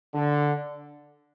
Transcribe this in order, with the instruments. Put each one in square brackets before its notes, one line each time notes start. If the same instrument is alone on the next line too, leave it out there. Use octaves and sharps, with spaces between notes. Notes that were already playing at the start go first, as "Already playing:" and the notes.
[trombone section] D3